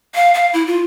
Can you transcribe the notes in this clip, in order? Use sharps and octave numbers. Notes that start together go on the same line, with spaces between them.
F5
F5
E4
F4